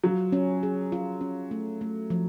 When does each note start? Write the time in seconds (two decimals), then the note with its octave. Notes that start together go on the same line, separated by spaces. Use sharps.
0.04 F#3 F4
0.32 C#4
0.63 G#4
0.92 F4
1.21 C#4
1.51 A3
1.81 A3
2.10 F3